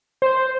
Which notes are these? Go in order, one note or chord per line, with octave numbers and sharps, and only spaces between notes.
C5